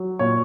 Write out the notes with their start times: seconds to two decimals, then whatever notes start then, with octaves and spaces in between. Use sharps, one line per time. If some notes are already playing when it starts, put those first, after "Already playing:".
Already playing: F#3
0.19 A#2 C#5